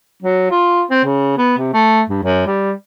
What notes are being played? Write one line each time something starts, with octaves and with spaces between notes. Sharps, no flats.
F#3
F4
C4
C#3
B3
C3
A3
G2
F#2
G3